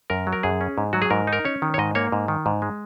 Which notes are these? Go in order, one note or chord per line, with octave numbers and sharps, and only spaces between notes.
F#2 A#4
F#3
A#4
F#2 G#4
C#4
G#2
F#3 F#4
G#4
G#2 A#4
D#4
A#4
C#4 C#5
D#3
C#5
G#2 D#5
A#3 C#5
G#2
D#3
G#2
G#3